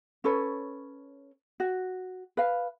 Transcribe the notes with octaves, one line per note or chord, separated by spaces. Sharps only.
C#4 A4 B4 C#5
F#4
B4 F5